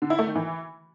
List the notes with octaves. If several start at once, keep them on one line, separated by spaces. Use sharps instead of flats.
D3
E4
A3
D#3
E3